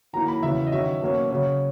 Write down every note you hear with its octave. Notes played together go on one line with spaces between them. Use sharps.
D#3 F#3 A#3 E4 A#5
B5
E2 C#3 F#3 C#4 E4 E5
D#5
D#3 F#3 C#4 E5
B2 F#3 A#3 C#4
C#3 F#3 C#4